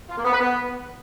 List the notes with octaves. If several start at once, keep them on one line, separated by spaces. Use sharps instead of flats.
F4
A#3
B3
B4
B3